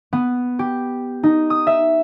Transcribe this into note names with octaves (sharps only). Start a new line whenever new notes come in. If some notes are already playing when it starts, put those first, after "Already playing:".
B3
G4
D#4
D#6
E5